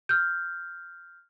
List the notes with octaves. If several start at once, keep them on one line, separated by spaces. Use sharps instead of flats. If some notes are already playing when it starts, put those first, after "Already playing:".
F6 G6